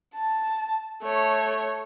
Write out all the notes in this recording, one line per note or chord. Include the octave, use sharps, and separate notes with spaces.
A5
A3 C#5